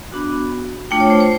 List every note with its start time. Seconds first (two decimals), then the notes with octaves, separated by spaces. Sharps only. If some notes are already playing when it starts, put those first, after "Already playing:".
0.12 B3 D4 F#4
0.91 A3 D4 F4 G5
1.00 C#5
1.10 C5
1.20 C5